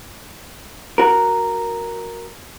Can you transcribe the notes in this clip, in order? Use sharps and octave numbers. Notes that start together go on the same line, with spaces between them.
F#4 A#4